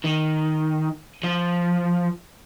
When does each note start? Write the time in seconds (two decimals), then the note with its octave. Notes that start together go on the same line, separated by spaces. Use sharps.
0.05 D#3
1.24 F3